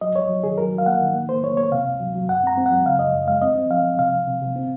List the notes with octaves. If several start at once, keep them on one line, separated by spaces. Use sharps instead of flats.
F#3 D#5
C2 C#5
F#3
D#3 G#4
F#3 A#4
F#3
F5
A#3 F#5
D#3
A#3
A#3 C5
A#3 C#5
A#3 C#5
C3 F5
C#2
F#3
F#3
F#2 F#5
C4 A#5
C4
F#3 F#5
C#3 F5
F#2 D#5
F#2
G#3 F5
C4 D#5
C4
F3 F5
F3
C3 F5
C2
C3
C3
C4